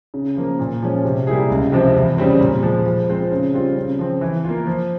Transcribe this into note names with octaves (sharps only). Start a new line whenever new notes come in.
C#3
F3 A#3
A#2
F3 G#3 C#4
C3
G3 A#3 E4 G#4
C#2
C3 F3 C4 E4
E2
C#3 G3 C4
A#2
F3 G#3
F3
G#3 C4 F4 C5
C#3
G3 C4 F4
C#3
F3 C4
E3
A#3 F4
F3